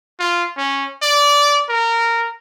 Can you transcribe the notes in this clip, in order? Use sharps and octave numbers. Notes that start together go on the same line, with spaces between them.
F4
C#4
D5
A#4